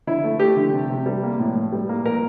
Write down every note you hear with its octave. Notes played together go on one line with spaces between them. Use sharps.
D3 E4
A3
A3 G4
D3
C3
C3
G3
A#3
A2
A2
G3
A#3
A#2 A#4